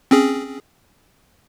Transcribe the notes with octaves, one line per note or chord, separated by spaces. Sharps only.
C4 C#4 G#4